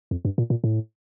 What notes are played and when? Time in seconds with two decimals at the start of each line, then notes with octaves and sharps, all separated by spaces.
0.11 F2
0.25 G2
0.38 A#2
0.50 A#2
0.64 A2